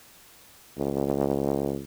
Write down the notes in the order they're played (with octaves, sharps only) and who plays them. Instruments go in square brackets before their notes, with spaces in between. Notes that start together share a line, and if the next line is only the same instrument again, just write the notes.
[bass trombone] C#2